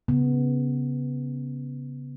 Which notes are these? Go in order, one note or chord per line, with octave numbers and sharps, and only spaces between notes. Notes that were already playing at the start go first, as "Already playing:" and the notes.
C#3 B3